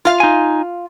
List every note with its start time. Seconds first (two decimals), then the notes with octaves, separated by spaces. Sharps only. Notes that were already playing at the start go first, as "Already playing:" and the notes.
0.05 F4 F5
0.20 D#4 G#5